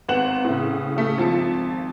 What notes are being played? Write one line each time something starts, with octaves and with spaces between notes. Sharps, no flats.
G#1 B3 F#5 E7 F#7
A2 C#3
C#3 A3 B6
G#1 F3 A5 C#7